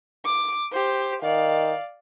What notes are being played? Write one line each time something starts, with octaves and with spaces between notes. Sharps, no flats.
D6
G4 C5
D#3 D5 F5